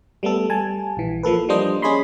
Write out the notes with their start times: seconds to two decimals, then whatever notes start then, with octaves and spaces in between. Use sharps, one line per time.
0.23 G3 A3 B3 A4
0.50 G3 G#5 A5
0.97 A#1 E3
1.23 F3 A#3 A4 B4
1.49 F3 G3 A#3 D4 C5 D#5
1.82 C#4 G#4 C#5 D#5 B5 C6